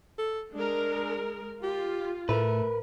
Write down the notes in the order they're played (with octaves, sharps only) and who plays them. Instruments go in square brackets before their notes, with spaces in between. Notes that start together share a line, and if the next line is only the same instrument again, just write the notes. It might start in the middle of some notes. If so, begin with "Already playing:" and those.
[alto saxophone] A4
[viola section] G#3 A#4 [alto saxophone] D4
[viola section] F4 [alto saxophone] G4
[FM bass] A2 [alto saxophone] A3 [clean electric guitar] A#4 B4